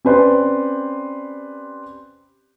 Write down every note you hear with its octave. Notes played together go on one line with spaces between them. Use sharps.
C4 C#4 G4 B4 C5 D5